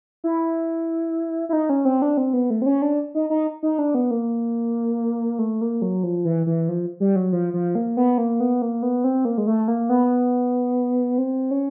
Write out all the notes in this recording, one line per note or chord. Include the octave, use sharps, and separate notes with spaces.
E4
E4
D#4
C#4
C4
D4
C4
B3
A3
C4
C#4
D4
D#4
D#4
D#4
D4
B3
A#3
A3
A#3
F#3
F3
E3
E3
F3
G3
F#3
F3
F3
A#3
B3
A#3
B3
A#3
B3
C4
A#3
G#3
A3
A#3
B3
C4
C#4